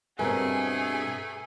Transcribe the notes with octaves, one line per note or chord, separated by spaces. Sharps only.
G2 B2 A3 C4 G#4 A#4 B4 G#5